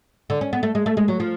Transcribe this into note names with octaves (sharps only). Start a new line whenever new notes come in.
D3
C#4
B3
A3
G#3
A3
G#3
F#3
F3